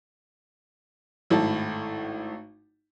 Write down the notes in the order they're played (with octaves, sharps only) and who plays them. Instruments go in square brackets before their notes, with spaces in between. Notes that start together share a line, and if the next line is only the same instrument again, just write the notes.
[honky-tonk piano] G#1 A2 E4 A5